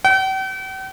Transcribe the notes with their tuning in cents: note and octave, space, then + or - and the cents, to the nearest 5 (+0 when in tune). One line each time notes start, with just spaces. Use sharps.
G5 -45